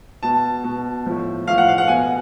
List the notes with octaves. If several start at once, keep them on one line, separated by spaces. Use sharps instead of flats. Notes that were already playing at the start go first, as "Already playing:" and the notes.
B2 A5
B2
A2 F3
A2 F3 F5
F#5
F5
F#5
B2 G#5